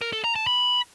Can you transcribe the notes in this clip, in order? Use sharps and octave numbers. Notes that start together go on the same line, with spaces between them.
A#4
A4
A#5
A5
B5